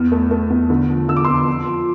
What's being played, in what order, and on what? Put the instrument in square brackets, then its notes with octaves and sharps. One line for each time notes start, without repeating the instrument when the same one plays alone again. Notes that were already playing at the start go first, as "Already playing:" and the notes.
Already playing: [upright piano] E2 F6
A3
A3
E2
D3
F3
D3 E6
D6
F2 C6 E6
F3
F3